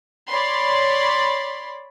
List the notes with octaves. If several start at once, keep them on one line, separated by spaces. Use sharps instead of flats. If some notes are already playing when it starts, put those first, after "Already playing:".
C#5 D5 B5 C6